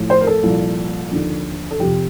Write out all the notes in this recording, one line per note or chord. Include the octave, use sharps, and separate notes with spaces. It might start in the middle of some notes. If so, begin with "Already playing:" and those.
Already playing: A2 F3
C5
A#4
A4
C2 A#2 F3
D#2 D3 F3
A4
F2 C3 F3 G4